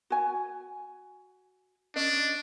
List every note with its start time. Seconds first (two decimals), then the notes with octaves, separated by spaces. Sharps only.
0.10 F#4 G#5
1.96 C#4 D4 D#5